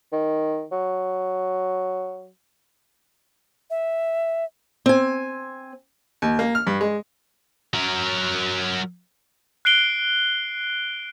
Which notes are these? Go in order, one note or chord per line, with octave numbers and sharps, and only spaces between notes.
D#3
F#3
E5
C4 G#5
D#2
A#3
F6
G2
G#3
F#3 A#4
F#6 C7 D7 G7